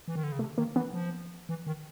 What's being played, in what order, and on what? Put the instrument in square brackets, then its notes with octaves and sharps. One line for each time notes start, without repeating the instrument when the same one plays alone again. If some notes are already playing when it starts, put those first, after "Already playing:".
[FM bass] E3
D#3
D3
C#3
[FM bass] C3 [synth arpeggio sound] A3
[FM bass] D#3 [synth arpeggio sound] A#3
[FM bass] E3 [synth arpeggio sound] B3
[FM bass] F3
E3
D#3